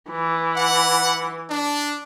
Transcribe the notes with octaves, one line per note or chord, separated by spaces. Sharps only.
E3
F#5
D4